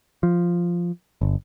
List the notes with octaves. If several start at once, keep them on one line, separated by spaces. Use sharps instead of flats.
F3
G1